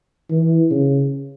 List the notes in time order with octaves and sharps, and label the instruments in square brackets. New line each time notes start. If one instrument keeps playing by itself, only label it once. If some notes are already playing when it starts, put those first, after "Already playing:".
[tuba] E3
C#3